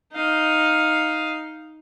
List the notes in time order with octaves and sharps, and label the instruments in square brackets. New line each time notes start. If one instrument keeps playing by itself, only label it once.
[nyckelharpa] D#4 F5